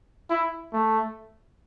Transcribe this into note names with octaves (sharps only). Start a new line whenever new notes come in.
E4
A3